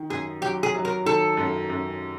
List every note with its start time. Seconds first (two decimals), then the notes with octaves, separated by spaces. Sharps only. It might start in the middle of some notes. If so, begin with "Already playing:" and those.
Already playing: D#3
0.10 F#2 G#4
0.41 F#3 G4
0.63 G#4
0.75 F#3
0.85 A#4
1.05 D#3 A4
1.37 F#2
1.70 F#2